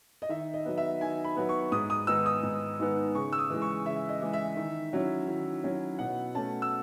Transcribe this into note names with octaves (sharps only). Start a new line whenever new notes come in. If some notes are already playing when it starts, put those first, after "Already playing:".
D#5
D#3 E5
D#5
F#3 B3
E5
D#3 G#5
B5
F#3 B3
C#6
G#2 D#6
D#6
D#3 G#3 B3 D#4 E6
D#6
G#2
D#3 G#3 B3 D#4
C#3 C#6
E6
D#6
E3 G#3
C#6
C#3 E5
D#5
E3 G#3
E5
D#3
F#3 C#4 E4
D#3
F#3 C#4 E4
B2 F#5
A3 C#4 A5
E6